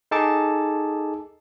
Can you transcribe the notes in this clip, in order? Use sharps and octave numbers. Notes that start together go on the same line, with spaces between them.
D#4 G#4 A4 A5 D6